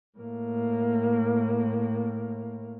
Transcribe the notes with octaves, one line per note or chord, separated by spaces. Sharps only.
A2 A#3